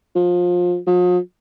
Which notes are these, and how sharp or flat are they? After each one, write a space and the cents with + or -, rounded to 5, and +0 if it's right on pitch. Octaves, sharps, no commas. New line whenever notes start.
F3 +25
F3 +45